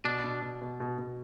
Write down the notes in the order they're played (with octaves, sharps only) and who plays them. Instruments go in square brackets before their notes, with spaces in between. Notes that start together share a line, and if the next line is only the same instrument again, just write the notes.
[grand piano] B2 [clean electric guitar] D4
[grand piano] B2
B2
B2
B2
B2